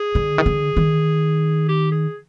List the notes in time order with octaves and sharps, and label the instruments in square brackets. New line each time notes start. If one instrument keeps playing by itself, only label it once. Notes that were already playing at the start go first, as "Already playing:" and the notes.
Already playing: [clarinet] G#4
[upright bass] D3
D#3
D3
D#3
[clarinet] G4
G#4